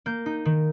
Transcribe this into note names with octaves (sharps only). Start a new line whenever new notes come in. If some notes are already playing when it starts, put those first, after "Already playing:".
A#3 G6
D#4
D#3